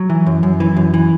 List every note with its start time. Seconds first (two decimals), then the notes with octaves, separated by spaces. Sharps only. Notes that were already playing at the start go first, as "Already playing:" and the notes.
Already playing: F#3
0.10 E3
0.26 F#2
0.43 F#2
0.60 E3
0.77 F#2
0.94 E3